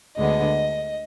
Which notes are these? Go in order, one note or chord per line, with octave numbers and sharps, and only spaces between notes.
D2 D3 G#3 B3 D#5